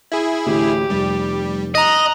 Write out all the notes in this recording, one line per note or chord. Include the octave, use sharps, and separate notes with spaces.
E4 G#4
A1 D2 G4
F1 G3
D#5 A#5 F#6